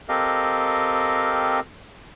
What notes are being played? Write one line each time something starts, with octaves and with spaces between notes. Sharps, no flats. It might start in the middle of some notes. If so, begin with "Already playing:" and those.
C4 G4 A4 A#4 D#5 F5